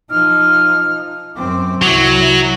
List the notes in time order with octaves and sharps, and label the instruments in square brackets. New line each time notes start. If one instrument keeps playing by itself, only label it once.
[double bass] F3 D#4 [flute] F6
[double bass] F#2 C4 [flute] D6
[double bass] C2 E4 [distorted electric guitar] F#3 [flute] F#5